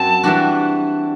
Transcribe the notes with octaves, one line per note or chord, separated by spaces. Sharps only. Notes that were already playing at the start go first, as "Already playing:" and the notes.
Already playing: F#2 F#3 C4 A5
E3 G3 D4 F#4